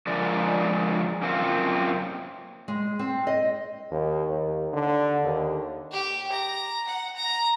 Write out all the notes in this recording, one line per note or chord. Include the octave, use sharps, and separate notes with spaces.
F3 G#3 D4 A#4 D5
F#2 A#3 C4 F4
G#3
C4
D#5
D#2
D#2
D3
D#2
G4
A#5
F#5
A#5